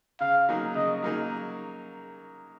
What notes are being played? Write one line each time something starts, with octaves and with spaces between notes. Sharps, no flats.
C#3 F5
F#3 A#3 D#4 G#4
C#3 D#5
F#3 A#3 D#4 G#4